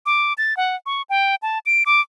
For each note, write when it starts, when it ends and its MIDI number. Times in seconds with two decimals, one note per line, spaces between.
0.06 0.33 86
0.38 0.56 93
0.57 0.76 78
0.86 1.02 85
1.10 1.35 79
1.42 1.59 81
1.66 1.84 98
1.86 2.01 86